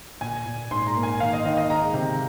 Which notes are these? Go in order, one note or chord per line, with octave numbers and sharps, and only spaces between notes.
A#2 G#5
A#2
G#2 C6
A#5
A#3
G#5
D#3 F5
D#5
D#3 D#5
D#5
G#3 A#5
C3